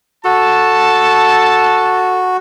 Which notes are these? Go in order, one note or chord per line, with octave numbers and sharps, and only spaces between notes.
F#4 A4 A5